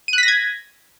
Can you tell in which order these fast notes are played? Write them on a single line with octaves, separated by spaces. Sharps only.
D#7 F#6 B6 A#6 G#6